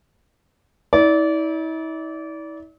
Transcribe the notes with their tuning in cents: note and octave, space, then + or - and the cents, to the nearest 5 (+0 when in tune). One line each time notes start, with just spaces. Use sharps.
E4 -45 D5 -25